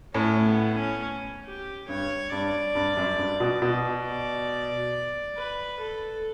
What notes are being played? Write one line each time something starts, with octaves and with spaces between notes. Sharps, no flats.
A2 C#4
B3
C#4
G4
G2 C#5
G2 D5
G2
F#2
G2
B2
B2
D5
B4
A4